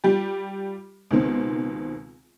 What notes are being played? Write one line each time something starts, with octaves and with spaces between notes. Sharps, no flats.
G3 F4 G4
C#2 B2 D#3 C4